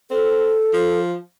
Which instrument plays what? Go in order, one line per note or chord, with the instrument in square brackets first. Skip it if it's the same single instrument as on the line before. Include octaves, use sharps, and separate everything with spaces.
[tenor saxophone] C4 [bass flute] A4
[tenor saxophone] F3